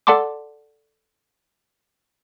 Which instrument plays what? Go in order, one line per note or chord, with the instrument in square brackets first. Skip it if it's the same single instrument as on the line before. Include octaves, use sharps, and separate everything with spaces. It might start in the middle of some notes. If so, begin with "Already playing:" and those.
[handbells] A4 D5 F#5 A5 C6 D6